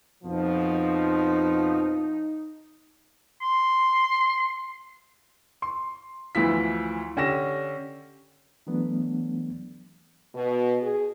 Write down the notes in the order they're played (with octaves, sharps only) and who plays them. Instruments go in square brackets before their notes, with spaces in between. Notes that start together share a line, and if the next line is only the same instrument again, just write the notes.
[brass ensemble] F2 B2 F3 [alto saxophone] D#4
[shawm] C6
[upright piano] C6
D2 E3 F3 E4 B6
D3 C#4 G4 A#6 E7
[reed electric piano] E3 F#3 A3 B3 D4
[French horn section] B2
G#4